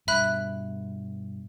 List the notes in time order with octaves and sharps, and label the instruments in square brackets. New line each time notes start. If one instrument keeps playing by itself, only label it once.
[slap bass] G2 B2 [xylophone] E5 B5 F#6